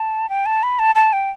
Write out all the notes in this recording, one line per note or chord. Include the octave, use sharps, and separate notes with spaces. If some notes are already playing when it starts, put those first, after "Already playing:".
Already playing: A5
G5
A5
B5
A5
A5
G5